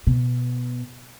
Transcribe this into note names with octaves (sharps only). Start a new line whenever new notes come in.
B2